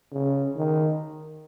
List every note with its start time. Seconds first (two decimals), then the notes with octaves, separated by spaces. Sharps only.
0.12 C#3
0.57 D#3